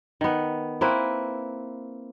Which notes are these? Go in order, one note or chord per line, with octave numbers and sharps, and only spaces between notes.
D#3 B3
A#3 C4 E4 B4